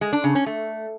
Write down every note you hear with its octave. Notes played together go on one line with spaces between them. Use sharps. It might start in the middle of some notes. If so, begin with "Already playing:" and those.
G#3
D4
C#3
C#4
A3